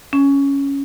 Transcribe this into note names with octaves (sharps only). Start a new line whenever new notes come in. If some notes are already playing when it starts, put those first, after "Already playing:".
C#4